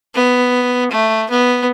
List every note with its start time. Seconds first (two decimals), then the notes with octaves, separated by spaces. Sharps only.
0.15 B3
0.91 A3
1.30 B3